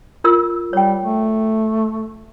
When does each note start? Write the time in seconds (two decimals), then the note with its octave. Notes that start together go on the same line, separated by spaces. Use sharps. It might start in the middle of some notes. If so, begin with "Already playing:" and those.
0.24 F4 A#4 E6
0.73 G3 C#5 G5
1.04 A3